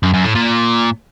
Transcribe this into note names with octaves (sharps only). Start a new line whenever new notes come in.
F#2
F#2
A2
A#2